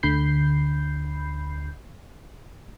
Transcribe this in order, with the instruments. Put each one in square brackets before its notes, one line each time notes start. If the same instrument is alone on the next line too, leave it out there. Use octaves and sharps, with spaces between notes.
[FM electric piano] D2 D3 B5 G6 C7